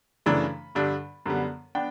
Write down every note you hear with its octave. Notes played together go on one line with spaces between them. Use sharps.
F#2 C#3 E3 A3 D4 B5
G2 D3 G3 D4
F#2 D3 G3 B3
B3 D4 G5